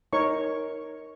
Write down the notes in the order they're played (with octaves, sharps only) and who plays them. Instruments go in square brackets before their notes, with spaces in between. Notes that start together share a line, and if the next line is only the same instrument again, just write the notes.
[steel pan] D#4 A#4 C#5 C#6